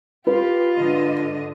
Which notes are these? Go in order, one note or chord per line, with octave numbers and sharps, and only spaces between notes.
F4 G4 B4
G#2 D3 D#5